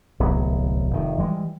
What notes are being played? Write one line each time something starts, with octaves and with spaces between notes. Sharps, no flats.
D1 C2 F#3 B3
F1 D#3
E3 G3 G#3